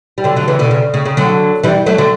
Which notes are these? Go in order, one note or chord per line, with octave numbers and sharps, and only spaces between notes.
G3
D3 F#3
D3 F#3
C#3 E3
B2 D3
C#3
C#3
C#3
D3 F#3
E3 G3
F#3 A3
D3 F#3